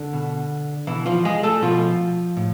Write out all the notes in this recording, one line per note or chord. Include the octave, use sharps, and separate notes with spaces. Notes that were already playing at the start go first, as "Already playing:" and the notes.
Already playing: D3
B2
B2 E3 E4
F3 F4
G#3 G#4
A3 A4
B2 F3 F4
A2